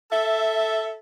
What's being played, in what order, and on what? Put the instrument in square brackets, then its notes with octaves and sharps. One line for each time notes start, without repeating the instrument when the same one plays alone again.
[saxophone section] A4 E5